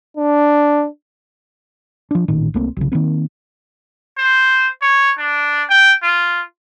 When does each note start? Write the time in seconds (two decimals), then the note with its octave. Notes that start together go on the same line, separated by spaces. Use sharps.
0.17 D4
2.11 F3 D4
2.28 A1 A#2 D#3
2.54 C2 A3 A#3 C4
2.77 B1 C#3
2.92 D#3 E3 A#3 C4
4.18 C5
4.82 C#5
5.18 D4
5.70 G5
6.03 F4